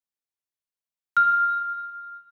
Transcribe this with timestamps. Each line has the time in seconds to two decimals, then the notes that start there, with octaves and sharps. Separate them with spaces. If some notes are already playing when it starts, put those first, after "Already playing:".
1.17 F6